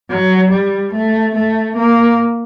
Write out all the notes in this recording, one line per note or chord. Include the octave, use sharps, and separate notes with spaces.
F#3
G3
A3
A3
A#3